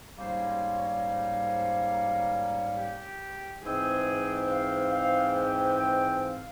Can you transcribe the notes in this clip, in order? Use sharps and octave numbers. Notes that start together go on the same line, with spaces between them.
G#2 G3 A#3 C#4 C5
C5
C#5
C5
A#4
G4
G#2 E3 G#3 C4 G#4
F5
F5
G5
G5
F5